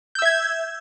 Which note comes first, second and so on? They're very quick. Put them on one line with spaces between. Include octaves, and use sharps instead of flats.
G6 E6 E5 G#6